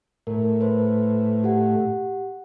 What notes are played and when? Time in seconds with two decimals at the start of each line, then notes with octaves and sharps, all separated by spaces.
0.27 A2 A#4
0.61 B4 C5
1.44 G4 F#5